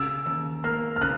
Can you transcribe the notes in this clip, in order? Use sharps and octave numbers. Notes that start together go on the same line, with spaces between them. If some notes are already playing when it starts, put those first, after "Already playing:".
Already playing: C#3 E6
D#2
A#3 F6
F6
C#3 F#6